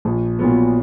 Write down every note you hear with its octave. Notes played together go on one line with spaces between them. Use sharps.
A#1
A#2 F#3 B3